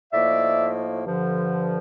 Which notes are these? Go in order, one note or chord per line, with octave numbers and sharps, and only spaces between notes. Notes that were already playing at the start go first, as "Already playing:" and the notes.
A2 F3 A#3 D#4 D5 E5
G2 D3 F3